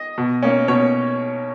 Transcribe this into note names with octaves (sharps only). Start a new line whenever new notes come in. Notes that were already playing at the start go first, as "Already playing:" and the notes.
Already playing: D#5
B2
A#3 C#4
B2 C#5